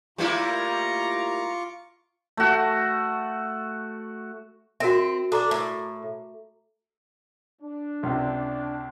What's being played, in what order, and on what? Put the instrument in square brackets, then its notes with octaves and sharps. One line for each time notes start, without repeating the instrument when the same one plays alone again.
[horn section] A2 A#5 [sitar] G3 A#3 E4 [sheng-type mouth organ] F4 C#6 D6
[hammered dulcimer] A3 F#4
[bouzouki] C4 [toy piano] F#4 A#4 E5
[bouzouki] D4 [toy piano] A4 A#5 D6
[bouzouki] A2
[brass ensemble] D4
[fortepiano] C#2 C3